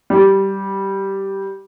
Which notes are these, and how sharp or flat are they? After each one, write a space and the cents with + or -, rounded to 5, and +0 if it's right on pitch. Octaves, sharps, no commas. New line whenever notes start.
G3 -10